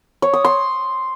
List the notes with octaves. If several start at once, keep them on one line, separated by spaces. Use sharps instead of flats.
C#5
D#6
C6